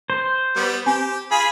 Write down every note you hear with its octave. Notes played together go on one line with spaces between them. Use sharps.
C5
G3 B3
C4 G4 G#5
F4 G#4 G#5 B5